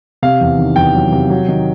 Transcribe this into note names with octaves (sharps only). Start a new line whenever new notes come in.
C3 F5
E2
D#3
E2 G5
F#3
C3
F#3
D#3